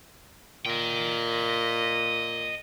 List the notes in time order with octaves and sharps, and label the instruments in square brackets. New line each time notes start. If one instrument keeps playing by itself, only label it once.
[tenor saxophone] A#2 [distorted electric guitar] D#5 G5